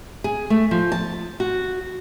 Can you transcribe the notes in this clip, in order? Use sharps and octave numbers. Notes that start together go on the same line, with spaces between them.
G#4
A3
F3
A5
F#4